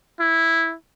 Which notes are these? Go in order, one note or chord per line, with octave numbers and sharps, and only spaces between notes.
E4